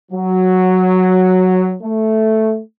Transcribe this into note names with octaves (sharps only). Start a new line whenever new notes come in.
F#3
A3